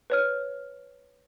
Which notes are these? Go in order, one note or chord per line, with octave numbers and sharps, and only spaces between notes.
B4 C#5 F6